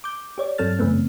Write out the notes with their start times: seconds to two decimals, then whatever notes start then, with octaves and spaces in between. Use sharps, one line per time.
0.04 D6 G6
0.38 G4 C#5 D5
0.58 G2 F#3 C4 A4 F6 A6
0.79 F#2 C#3 E3 A3 B3 C4